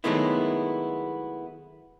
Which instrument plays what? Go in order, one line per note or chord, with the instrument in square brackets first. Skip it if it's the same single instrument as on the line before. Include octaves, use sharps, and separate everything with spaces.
[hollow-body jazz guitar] D#3 F#3 G#3 A3 B3 E4